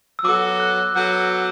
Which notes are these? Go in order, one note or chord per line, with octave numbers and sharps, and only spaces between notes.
E6
F#3 B3 F#4 A4 D6
F#6
F#3 B3 F#4 A4 G6